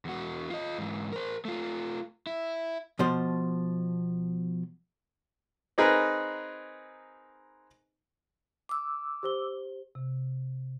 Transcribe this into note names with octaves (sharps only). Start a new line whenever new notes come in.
E2 F#4
F4 D#5
G#2 E3
A#4 C5
A3 F4
E4
B2 F3 C5
C4 D#4 G#4 A#4 B4
D6 E6
G4 C5 G7
C3